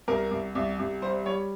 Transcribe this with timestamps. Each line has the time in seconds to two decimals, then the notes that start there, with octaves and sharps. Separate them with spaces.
0.08 C2 A#4
0.31 C2
0.55 C2
0.79 C2
1.02 G3 C5
1.26 G3 C#5